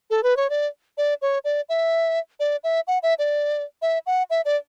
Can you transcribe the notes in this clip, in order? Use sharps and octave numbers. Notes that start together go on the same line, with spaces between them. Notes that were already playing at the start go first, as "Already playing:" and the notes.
A4
B4
C#5
D5
D5
C#5
D5
E5
D5
E5
F#5
E5
D5
E5
F#5
E5
D5